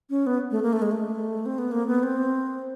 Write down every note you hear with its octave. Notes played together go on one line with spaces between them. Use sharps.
C#4
B3
A3
A#3
A3
G#3
A3
C4
B3
A#3
B3
C4